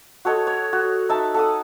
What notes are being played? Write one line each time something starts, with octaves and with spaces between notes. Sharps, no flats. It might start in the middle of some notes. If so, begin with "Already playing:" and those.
F#4 A4 C#5 D#5
C#5
F#4
D#4 E5 A5
A4 F#5 D#6